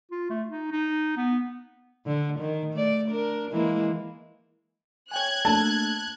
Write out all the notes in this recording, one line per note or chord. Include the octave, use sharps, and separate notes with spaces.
F4
A3
D#4
D#4
B3
D3
D#3
A3 D5
D4 A#4
E3 G#3 A#3
C#5 G5 G#5 F#6 G#6
A3 A#3 D4 A5